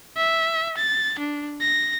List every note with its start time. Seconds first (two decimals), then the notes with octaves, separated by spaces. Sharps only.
0.17 E5
0.77 A6
1.19 D4
1.61 A#6